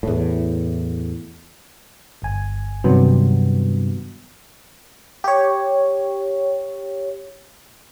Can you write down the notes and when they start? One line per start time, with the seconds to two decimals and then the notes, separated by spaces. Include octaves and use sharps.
0.03 E2 A2
2.22 G1 G#5
2.84 G2 C3 D#3 F#3 B3
5.24 G4 C#5